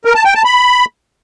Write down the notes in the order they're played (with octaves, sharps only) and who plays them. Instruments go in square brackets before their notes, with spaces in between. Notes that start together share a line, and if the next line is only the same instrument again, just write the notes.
[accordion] A#4
A5
G5
A5
B5